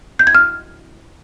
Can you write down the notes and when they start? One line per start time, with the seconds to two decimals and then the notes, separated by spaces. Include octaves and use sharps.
0.19 G6
0.27 G#6
0.35 F6